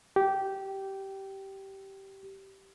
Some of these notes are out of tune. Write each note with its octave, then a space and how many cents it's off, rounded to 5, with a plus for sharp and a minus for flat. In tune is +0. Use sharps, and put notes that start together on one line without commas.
G4 -15